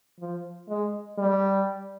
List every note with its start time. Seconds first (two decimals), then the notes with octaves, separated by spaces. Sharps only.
0.20 F3
0.69 G#3
1.18 G3